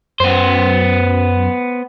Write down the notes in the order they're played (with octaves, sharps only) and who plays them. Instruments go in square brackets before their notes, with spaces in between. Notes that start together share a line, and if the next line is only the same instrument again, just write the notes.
[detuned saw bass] F#2 [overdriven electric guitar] B3 C5